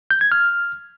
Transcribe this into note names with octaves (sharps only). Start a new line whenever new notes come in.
G6
G#6
F6